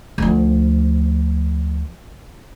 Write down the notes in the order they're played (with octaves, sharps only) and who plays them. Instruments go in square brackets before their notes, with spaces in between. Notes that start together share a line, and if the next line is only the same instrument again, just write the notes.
[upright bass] D2 F3